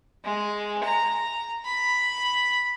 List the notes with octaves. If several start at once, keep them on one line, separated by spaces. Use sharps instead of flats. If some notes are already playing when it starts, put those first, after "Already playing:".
G#3
A#5
B5